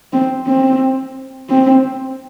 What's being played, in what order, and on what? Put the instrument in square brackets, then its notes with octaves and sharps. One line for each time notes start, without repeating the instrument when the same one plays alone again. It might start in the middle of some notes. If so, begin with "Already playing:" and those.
[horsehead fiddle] C4
C4
C4